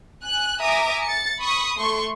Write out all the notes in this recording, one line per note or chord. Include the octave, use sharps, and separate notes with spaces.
G#5 F#6
E5 G#5 A#5 D6 D#6
A6 C#7
B5 C#6 D#6
A3 C6 C#6